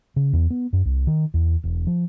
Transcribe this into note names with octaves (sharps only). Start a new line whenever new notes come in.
C#3
E2
B3
F#2
C2
D#3
E2
E1
F3